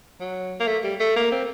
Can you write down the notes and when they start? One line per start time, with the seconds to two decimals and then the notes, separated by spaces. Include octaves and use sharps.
0.20 F#3
0.60 A#3
0.67 A3
0.84 G3
1.00 A3
1.16 A#3
1.32 C4